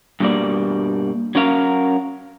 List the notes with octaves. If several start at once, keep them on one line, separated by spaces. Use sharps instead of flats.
G2 B2 G3 A#3 D5
F#3 C#4 A#4 F5